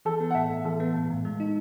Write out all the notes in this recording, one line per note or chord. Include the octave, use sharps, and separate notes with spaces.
E3 A4
B3
F#5
A2 E5
A2
E3 A4
B3
A2
A2
G#3
D#4